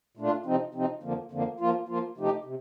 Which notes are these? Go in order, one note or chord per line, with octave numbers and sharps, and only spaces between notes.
A#2 A3 D4 F4
C3 F3 C4 D#4
C3 F3 C4 D#4
F2 D3 F3 A#3
F2 D3 F3 A#3
F3 A#3 F4
F3 A#3 F4
C3 F3 A3 D#4 G4
C3